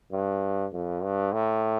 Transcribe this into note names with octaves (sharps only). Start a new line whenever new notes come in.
G2
F2
G2
A2